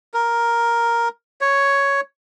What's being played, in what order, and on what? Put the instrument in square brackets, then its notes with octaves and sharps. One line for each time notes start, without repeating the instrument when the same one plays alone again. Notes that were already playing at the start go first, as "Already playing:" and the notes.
[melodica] A#4
C#5